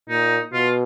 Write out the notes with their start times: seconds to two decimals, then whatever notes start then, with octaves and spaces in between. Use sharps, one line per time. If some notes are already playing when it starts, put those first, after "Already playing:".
0.09 A#2 D#4
0.53 B2 F4